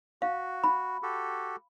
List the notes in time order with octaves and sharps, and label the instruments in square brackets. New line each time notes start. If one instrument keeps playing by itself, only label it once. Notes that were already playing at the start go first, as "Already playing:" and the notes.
[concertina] F#4 [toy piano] F5
[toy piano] B5
[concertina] F#4 G4 A4